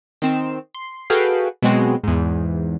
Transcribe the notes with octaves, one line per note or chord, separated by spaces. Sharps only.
D#3 C4 E7
C6
F#4 G#4 A4 B4 F5 G5
B2 F#3 G#3 C4 F#4
E2 G#2